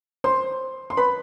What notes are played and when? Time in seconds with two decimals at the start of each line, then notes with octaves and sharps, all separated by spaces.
0.24 C5 C6
0.90 C6
0.97 B4 B5